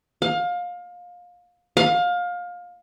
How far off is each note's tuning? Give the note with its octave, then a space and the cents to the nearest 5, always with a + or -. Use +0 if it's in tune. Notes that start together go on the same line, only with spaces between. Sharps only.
F5 +25
F5 +25